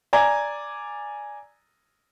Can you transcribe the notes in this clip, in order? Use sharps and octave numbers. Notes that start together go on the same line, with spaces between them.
D5 G#5 A#5 G#6